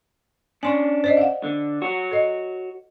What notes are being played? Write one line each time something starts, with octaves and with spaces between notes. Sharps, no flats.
C#4 D4 G#5 C6 C#6
C5 D5 D#5
F5 F#5
D3
F#4 C#5
A4 D#5